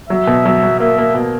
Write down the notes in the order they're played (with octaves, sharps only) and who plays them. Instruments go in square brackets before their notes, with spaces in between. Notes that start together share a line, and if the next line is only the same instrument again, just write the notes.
[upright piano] F#3 [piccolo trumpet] E5
[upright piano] B2
F#3
F#3
[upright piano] A#3 [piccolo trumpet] E5
[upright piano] A#3
B2